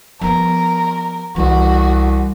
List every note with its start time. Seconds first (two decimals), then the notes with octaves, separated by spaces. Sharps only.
0.21 F3 B3 A#4
1.36 C2 E3 F#4